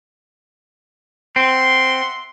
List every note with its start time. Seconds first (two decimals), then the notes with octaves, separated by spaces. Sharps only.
1.36 C4 E5 F#5 C6